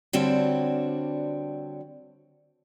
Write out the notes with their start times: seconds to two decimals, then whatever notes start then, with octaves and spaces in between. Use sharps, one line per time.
0.13 D3 G3 C4 D4 F#4 C#5